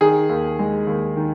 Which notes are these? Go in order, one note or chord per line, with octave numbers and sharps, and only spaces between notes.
D#3 G#4
D#2
G#3
D#2
D#3